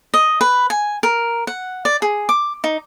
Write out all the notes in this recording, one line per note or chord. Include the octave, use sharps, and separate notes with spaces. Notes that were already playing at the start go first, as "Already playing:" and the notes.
D#5
B4
G#5
A#4
F#5
D5
G#4
D6
D#4